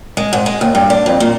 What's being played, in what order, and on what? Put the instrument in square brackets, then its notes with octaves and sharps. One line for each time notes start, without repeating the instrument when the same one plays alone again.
[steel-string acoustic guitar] G#3
G#2
G#3
D#2
G2
D4
F2
A#2